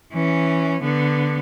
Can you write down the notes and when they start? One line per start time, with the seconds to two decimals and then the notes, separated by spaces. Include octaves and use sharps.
0.13 E3 C#4
0.83 D3 B3